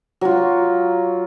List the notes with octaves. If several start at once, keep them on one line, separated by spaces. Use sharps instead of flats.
F#3 F4